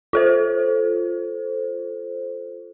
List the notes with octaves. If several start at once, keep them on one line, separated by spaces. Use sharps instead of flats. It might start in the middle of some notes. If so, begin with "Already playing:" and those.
F4 A4 C5